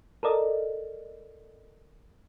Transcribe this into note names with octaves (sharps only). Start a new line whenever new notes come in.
A4 A#4 D5 D#5